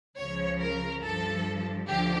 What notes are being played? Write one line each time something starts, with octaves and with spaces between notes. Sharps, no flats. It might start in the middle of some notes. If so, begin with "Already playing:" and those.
C#2 C#3 F3 C#5
A#4
G2 F3 A4
D2 D3 F3 G4